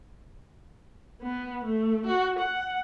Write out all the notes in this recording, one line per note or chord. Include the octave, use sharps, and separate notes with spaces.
B3
A3
F#4
F#5